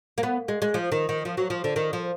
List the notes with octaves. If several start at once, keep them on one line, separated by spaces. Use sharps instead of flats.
A#3
B3
G#3
G#3
F3
D#3
D#3
F3
F#3
F3
D3
D#3
F3